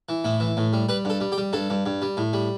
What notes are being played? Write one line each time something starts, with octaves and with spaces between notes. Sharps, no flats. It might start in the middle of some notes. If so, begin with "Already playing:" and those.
E3
A2 E4
E3
A2
G3
G3 B4
G2 A4
G3
G4
G3
G2 A4
G2
G2
G3
A2
G3